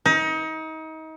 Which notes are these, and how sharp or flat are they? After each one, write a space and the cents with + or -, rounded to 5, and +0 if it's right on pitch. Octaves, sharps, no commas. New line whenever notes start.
D#4 +30